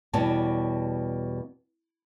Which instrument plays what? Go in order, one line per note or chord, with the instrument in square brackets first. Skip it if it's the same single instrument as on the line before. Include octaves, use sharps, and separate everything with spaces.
[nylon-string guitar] E2 B2 G3 F#4 C#5 A5